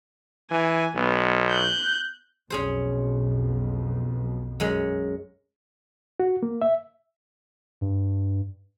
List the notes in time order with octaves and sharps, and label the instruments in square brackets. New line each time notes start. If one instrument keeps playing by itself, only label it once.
[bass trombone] E3 [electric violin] G#5
[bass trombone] B1 [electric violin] B3
[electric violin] F#6 G6
[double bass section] B1 F2 B2 [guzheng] C#4 G#4 C5
[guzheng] F#2 G#3 C#4
[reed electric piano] F#4
A#3
E5
[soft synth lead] G2